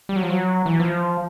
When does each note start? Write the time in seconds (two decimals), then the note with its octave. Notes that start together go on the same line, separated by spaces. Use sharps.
0.09 G3
0.16 F#3
0.23 F3
0.30 F#3
0.66 E3
0.80 F3